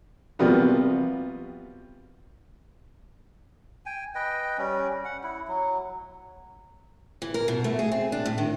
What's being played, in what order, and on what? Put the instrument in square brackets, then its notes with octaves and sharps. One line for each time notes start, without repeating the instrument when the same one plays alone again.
[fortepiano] C3 F3 G3 A#3 B3 F#4
[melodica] G5 G#5
B4 D#5 G5
G3 C#4
F#5
E4
F#3
[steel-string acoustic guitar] E3
A#4
B2
A3
G#4
C4
D4
A2
D#3